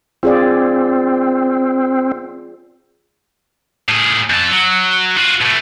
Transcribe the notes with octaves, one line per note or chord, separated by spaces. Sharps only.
C4 F4 G#4 D5
A2 G#4
F2 A4
F#3
F4 F#4
B2 A3